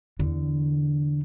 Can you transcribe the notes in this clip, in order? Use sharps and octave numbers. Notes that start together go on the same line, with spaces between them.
E2 D3